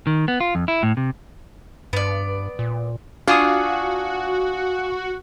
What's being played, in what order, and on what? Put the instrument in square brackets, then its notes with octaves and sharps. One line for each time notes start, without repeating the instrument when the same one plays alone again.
[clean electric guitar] D#3
B3
F4
F2
E4
A2
C3
[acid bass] G2 [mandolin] B3 D5
[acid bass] A#2
[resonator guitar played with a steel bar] D4 F4 [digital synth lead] F#4 [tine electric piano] F5 G#5 D#6